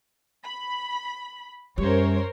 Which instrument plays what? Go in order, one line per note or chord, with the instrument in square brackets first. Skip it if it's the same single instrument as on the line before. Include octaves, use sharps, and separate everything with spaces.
[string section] B5
[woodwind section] F#2 [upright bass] G3 [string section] A#4 C5 C#5